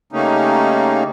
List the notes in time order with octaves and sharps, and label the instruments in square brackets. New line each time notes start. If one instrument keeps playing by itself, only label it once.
[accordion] C#3 G3 A3 A#3 C#4 D#4